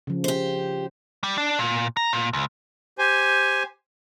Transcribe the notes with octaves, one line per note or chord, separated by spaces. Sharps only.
C#3 F3
G4 C5
G3
D4
A#2
A#5
A#2
C#2
G4 C5 G#5